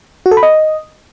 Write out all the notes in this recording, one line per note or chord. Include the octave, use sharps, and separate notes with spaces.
F#4
A4
B5
D#5